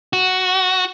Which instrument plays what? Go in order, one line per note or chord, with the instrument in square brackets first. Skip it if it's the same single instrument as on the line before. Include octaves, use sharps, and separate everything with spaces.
[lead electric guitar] F#4